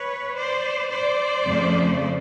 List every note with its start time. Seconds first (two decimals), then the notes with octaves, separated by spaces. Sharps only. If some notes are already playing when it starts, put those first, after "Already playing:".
Already playing: B4 C#5
0.36 C5 D5
0.90 C5 D5
1.45 F2 C#3 F3 A3